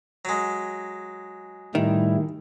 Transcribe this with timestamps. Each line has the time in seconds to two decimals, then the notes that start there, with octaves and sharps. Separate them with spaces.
0.25 F#3 G#3
1.75 A2 D#3 G3 E4